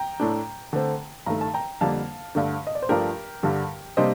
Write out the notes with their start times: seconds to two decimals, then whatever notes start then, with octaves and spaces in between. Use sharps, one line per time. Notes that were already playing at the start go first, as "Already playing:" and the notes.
Already playing: G5 A#5
0.20 A2 A3 D4
0.73 D3 A3 C4
1.26 G2 D#3 A3 A#5
1.41 A5
1.54 G5 A#5
1.81 F2 D3 G3 A#3 D4 F5 A5
2.35 G2 D3 A3 D4
2.67 D#5
2.75 D5
2.82 C5
2.89 G2 F3 A3 D4 G4 A#4
3.43 G2 D3 G3
3.97 C3 G3 A#3 D4 C5 D#5